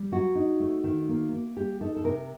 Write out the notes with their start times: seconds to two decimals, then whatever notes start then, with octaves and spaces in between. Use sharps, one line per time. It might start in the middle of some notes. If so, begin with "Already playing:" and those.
Already playing: G3
0.12 F#3 F#4
0.35 D#4
0.60 A3
0.84 D#3
1.09 A#3
1.33 A#3
1.56 G3 G4
1.81 D#4 A4
1.96 A4
2.04 C3 A#4